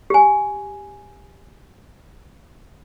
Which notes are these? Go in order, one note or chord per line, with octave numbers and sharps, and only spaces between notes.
G4 G#5